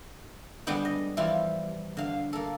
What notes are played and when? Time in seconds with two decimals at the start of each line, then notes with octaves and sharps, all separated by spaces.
0.67 D3 G3 G#3 B3 G4
0.85 D#5
1.17 E3 F3 G3 E4 F4
1.97 D3 F5
2.33 A#3 A4